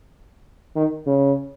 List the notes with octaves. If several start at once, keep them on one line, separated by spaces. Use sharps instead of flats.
D#3
C#3